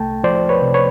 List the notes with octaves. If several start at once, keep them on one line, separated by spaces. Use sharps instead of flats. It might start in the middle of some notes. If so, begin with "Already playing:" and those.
Already playing: C2 A3 G5 A5
F3 C5 D5
B4 C#5
C3
B4 C#5